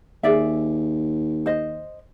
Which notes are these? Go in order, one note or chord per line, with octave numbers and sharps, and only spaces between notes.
D#2 G#4 D5 E5
C5 D#5